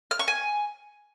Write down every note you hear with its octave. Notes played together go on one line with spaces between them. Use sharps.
F6
C#6
G#5